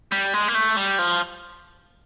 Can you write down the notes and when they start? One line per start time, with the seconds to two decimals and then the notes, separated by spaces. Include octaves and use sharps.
0.12 G3
0.34 G#3
0.48 A#3
0.55 A3
0.77 G3
0.99 F3